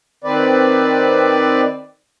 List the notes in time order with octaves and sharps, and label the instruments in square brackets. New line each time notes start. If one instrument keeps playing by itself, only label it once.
[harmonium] D#3 C4 B4 D5